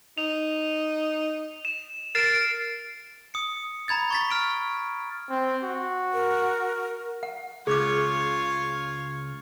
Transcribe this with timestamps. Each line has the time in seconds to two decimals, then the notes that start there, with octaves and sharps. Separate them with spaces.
0.18 D#4 F7
1.65 E7
2.15 A#4 A6 C7 D7 E7
3.34 D#6 C#7
3.88 A#5 B5 G#6 A6
4.10 C#6 A6 B6
4.30 C#6 F6 D7
5.30 C4
5.63 F#4
6.14 A#4
7.23 F#5
7.67 C#2 C#3 F4 G#4 C#5 D6